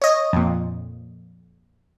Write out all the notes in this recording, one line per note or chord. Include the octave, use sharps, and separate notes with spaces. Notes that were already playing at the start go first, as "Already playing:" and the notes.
C#5 D#5
F2 A#2